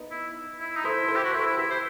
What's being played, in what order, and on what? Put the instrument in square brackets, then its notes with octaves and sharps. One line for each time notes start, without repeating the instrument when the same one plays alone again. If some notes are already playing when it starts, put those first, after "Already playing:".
Already playing: [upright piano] B3 D#4
[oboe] E4
E4
D#4
[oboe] E4 [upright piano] A4 C5
[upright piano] A4 C5
[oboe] G4
F#4
[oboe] E4 [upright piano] A4 C5
[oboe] E4
[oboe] E4 [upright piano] G4 B4
[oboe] C5